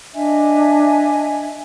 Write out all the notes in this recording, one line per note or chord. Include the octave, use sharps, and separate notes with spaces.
D4 D#5 E5 G#5